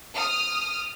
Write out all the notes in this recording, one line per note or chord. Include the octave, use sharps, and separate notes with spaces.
D#6 F6